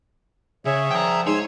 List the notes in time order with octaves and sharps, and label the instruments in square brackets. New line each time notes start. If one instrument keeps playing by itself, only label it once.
[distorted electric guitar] C#3 [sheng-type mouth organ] G#4 E5 [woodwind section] C#5
[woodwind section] C2 F3 [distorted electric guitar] G5 A#5
[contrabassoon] G#2 [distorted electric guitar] C#5 [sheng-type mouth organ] G#5 C6 E6